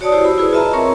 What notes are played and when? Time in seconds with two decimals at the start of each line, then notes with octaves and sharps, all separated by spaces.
0.01 F#4 C#5 D5 A5 D#6
0.12 E4 F#4 G4 C5
0.25 B5 E6
0.38 E4 G#4 B4
0.53 F4 D#5 E5 A5 A#5
0.73 C4 A#4 C#5 A#5 C#6